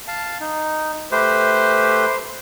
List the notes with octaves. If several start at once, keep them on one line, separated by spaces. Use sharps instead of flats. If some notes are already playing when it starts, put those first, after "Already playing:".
F5 A5
D#4
A3 G4 B4 C5